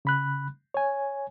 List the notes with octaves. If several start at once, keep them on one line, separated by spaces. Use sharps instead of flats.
C#3 B5 F#6
C#5 G#5